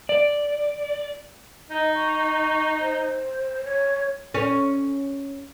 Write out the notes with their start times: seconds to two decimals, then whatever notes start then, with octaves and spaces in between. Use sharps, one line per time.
0.09 D5
1.71 D#4 D#5
1.95 C#6
2.80 C5
3.65 C#5
4.34 C#4